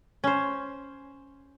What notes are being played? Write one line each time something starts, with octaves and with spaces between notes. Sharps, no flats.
C#4 C5